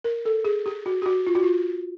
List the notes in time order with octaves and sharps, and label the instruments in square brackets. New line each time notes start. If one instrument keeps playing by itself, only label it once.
[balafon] A#4
A4
G#4
G4
F#4
G4
F#4
F4
F#4
F4